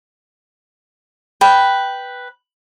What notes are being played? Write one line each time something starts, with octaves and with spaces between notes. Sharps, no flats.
B4 G5